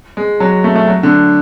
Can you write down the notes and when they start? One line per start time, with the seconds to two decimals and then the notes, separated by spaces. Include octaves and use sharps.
0.17 G#3
0.40 F#3
0.64 A3
0.75 A3
0.87 F#3
1.03 D3